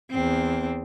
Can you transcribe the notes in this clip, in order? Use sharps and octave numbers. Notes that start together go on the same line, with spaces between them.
E2 C4